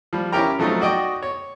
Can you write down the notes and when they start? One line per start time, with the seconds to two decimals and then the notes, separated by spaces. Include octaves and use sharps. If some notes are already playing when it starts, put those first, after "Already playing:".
0.13 F3 G3
0.32 C#4 E4 G4 A#4 G5 A#5
0.59 F3 F#3 A3 C4 D#4
0.81 F#4 D5 D#5 G5 D#6
1.23 C#5